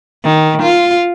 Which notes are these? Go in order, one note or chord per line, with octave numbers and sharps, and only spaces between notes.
D#3
F4